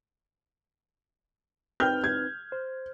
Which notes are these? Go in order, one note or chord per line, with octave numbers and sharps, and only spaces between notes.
C4 D#4 B4 G5 F6 G6
G#6
C5